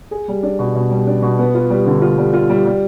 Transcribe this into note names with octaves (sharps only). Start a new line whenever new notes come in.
G#4
G3
D4
B2
B2
G3
D4
B2
B3
F4
G3
D3
F4
G3
F4
G3
G3